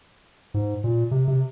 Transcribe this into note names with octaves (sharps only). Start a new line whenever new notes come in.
G#2
A#2
C3
C3